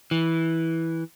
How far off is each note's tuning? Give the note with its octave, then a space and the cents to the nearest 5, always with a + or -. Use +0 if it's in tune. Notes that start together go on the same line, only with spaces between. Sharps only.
E3 -10